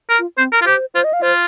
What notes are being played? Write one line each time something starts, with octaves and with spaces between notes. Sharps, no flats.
A#4
F4
C4 C5
A#4
F4
G4 C5
F4 C5
D#5
F5
F4 C5